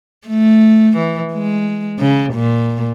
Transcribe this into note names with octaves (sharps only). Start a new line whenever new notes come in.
A3
E3
G#3
C#3
A#2